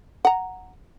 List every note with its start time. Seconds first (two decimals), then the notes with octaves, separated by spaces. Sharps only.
0.25 F#5 A#5